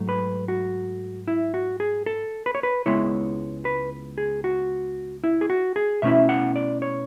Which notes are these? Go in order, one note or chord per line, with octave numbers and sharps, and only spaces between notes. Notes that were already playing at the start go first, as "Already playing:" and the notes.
Already playing: G#2 F#3 A3
B4
F#4
E4
F#4
G#4
A4
B4
C#5
B4
C#2 B2 G#3 B3 E4 C#5
B4
G#4
F#4
E4
G#4
F#4
G#4
B2 A3 C#4 E4 E5
F#5
D5
C#5